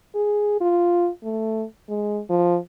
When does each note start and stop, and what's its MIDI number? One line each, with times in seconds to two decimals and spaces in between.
0.15 0.57 68
0.61 1.09 65
1.23 1.65 57
1.89 2.21 56
2.30 2.58 53